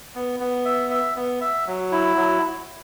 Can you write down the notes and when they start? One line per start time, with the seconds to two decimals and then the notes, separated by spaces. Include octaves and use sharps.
0.15 B3
0.40 B3
0.65 E5
0.91 E5
1.16 B3
1.41 E5
1.67 F#3
1.92 E4
2.17 F#3